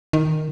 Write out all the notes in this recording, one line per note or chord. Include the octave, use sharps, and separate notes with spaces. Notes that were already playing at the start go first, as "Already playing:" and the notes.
D#3